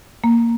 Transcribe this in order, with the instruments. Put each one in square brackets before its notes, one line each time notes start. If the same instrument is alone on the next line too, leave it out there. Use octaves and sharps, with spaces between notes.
[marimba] A#3